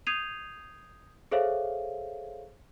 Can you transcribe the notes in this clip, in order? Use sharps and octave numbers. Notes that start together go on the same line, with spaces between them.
D#6 G6 G#6 C7 D#7 F7
G#4 A4 C5 C#5 E5 F5